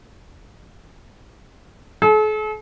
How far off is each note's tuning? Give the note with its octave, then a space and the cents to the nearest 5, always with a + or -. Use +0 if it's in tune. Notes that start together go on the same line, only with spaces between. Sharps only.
A4 -45